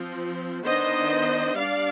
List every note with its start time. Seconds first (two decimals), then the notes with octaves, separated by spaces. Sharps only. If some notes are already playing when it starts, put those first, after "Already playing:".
Already playing: F3 C4
0.64 D#3 B3 D4 C5 D#5
1.57 G3 D4 D5 F5